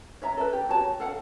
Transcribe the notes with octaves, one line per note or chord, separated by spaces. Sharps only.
C#5 E5 A#5
A4 B4
G4
F#4 C#5 A5
A4 F5 F#5